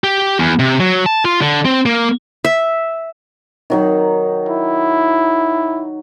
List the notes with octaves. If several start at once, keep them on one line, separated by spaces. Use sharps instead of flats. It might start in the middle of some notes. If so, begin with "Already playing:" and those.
G4
E2
C3
F#3
A5
F4
D3
C4
A#3
E5
D#3 F#3 D#4
E4